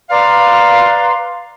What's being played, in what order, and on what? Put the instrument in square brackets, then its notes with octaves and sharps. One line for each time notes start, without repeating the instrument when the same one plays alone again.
[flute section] B4 A#5 C6 [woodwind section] D5 F5